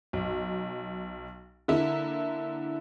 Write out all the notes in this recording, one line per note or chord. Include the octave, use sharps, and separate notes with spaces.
B1
D3 A#3 E4